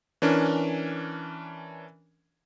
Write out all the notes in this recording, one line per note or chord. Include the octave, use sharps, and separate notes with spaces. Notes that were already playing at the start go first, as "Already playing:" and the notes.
E3 C#4 D4 A#4